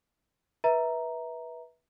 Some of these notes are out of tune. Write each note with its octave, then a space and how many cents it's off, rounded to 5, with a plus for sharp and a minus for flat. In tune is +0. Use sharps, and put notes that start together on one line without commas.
B4 -20 E5 -20 A#5 +0